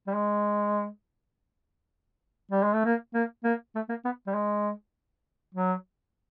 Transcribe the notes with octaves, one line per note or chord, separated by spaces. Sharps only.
G3
G#3
G3
G#3
A3
A#3
A#3
A#3
A3
A#3
B3
G3
G#3
F#3